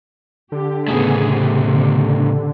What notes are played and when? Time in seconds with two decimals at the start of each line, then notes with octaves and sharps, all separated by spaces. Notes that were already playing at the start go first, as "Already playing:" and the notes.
0.52 D3 G4
0.88 A2 C#3 A3 B3 G#4
1.24 C3
1.74 D3